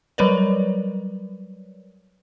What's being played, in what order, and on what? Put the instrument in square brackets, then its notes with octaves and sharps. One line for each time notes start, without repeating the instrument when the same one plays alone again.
[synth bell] F#3 G3 A#4 B4 C#5 D5